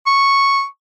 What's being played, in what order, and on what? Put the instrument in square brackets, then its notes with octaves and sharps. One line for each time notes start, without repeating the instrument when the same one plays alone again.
[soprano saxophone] C#6